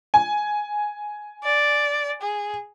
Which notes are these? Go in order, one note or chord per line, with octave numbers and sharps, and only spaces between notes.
G#5
D5
G#4